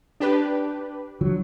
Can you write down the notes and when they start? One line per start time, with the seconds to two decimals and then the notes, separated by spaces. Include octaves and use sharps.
0.20 D4 G4 B4
1.21 D3 F3 F#3